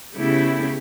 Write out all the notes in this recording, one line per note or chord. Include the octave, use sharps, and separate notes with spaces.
C#3 A3 B3 E4 G4